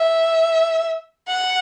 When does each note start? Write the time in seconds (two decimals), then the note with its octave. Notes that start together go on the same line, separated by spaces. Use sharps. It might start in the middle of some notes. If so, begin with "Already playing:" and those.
Already playing: E5
1.28 F#5